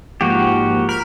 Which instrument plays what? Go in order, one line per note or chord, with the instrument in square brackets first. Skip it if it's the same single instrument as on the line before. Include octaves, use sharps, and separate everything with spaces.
[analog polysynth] G#2 F3 A#3 [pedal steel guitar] F#4 G4
[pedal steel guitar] A#4 [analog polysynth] B5 F6